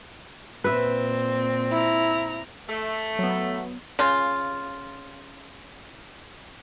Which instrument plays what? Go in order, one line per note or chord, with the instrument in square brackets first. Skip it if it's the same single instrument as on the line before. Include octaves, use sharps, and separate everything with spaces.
[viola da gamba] A#2 C4 [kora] B4 E5
[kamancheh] E4 A#5
[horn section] A3
[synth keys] F#3 B3
[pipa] C#3 F4